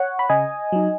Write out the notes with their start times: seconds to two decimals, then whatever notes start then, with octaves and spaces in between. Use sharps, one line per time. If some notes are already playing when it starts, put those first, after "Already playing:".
Already playing: C#5 F#5
0.19 B5
0.30 C#3 D#5 G#5
0.72 F#3 D#4